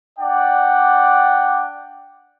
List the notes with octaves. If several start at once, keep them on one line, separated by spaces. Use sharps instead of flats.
D4 D5 F#5 G5